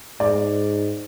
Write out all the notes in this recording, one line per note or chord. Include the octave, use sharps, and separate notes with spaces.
G#2 D5